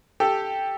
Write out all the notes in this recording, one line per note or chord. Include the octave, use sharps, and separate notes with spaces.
G4 A4